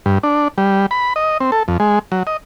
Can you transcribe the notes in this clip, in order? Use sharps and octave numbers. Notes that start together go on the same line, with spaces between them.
G2
D4
G3
B5
D#5
C4
A4
F2
G#3
F#3
D#5